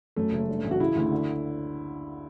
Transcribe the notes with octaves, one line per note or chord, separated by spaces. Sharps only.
F#2 A3
F#1
G2
A1
F#4
C#3 E4
D2
D3